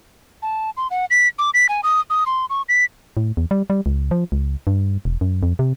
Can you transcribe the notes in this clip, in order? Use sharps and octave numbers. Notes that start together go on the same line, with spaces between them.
A5
C6
F#5
B6
D6
B6
G#5
D#6
D#6
C6
C#6
B6
A2
E2
G3
G3
C#2
F3
C#2
G2
E1
F#2
F2
C3